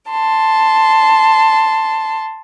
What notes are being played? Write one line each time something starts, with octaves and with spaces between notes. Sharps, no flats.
A5 C6